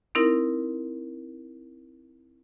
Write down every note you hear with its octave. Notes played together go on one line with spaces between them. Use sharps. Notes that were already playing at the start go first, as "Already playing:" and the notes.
C4 D#4 E4 A#4